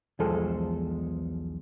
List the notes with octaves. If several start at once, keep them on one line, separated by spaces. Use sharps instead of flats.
B1 E2 F3 G#3 A4 C5